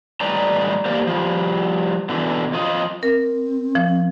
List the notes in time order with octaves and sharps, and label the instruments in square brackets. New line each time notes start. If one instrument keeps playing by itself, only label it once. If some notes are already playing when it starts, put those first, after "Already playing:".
[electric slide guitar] A2 G3 D#4 B4 D5 A#5
A#3 G4 C5 D5 F5
F3 G3
B2 D3 E3
F2 F4 D#5
[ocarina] C4 [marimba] A#4
[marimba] F3